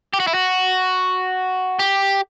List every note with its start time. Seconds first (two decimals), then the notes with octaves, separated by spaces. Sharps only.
0.13 G4
0.20 F#4
0.27 E4
0.34 F#4
1.79 G4